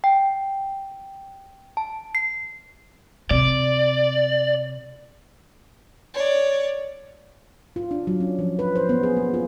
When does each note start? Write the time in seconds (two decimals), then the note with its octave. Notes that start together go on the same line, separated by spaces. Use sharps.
0.04 G5
1.77 A5
2.15 C7
3.31 C3 D5
6.13 C#5 D5
7.76 F4
7.91 D4
8.07 F#3
8.20 C#4
8.39 F3
8.59 B4
8.76 C5
8.89 B3
9.03 G#4
9.17 A#3
9.34 F4